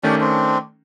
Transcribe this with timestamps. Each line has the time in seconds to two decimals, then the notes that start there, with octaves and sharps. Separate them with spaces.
0.03 D#3 A3 C#4 D4 G4 D5
0.20 C4 D4